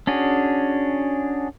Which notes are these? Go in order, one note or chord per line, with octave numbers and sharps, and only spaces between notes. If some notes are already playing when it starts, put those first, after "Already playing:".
C#4 D4 F#4 G#4